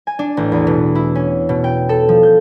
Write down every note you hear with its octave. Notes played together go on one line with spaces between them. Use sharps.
G#5
D4
A1
E2
B2
E4
C#4
B2
G5
A4
F3
G6